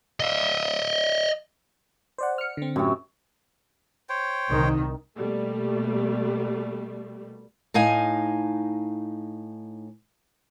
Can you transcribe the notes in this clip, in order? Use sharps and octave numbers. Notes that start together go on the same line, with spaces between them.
D#5 E5
C5 D5 F#5
F6 C#7
D3 C4
F#2 A2 C3
C5 C#5 G5
C2 D#3
B2 G3 A3 A#3
A2 D#4 F5 G#5